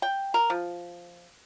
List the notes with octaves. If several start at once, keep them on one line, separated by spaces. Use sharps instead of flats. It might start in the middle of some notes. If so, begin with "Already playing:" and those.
G5
A#4
F3